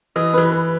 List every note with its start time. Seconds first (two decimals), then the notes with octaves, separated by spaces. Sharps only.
0.16 E3 D#5
0.34 E3 B4
0.52 B4